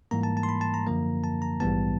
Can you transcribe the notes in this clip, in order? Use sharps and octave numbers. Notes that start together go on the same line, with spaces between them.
G#2 E3 G3 A#3 A#5
A5
A5
C6
B5
A5
A#5
F#2 D3 F3 A#3
A5
A#5
A#1 G#2 E3 G3 B3 A5